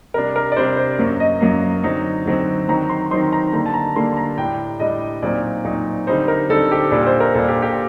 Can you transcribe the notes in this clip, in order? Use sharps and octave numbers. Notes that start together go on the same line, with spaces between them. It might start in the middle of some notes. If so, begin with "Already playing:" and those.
C3 G3 D4 A#4
A#4
D5
C3 G3 D4 C5
C5
F#2 F#3 A#3
D#5
F#2 F#3 A#3
D3 F#3 C4 D#4
D3 F#3 C4 D#4
D#3 F#3 C4 D#4 A#5
C6
D#3 F#3 C4 D#4 C6
A#5
D3 G3 A#3 A#5
A5
A#5
D3 G3 A#3 C6
A#5
A2 G3 D4 G5
A2 G3 D4 D#5
A#2 F#3 C4 D#4 D5
A#2 F#3 C4 D#4
D3 G3 C4 D#4 C5
A#4
D3 G3 C4 D#4 A4
G4
A#2 G3 D4 A4
C5
A#4
A#2 G3 D4 A4
G4
G4